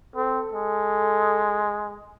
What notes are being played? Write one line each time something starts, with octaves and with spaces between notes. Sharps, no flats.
C4 A4
G#3